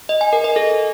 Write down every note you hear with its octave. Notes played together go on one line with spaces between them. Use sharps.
D#5
G#5
A#4
D#5
A4